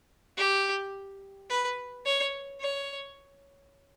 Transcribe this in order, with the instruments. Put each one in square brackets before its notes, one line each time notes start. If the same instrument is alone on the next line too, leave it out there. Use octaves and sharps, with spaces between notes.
[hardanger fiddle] G4
B4
C#5
C#5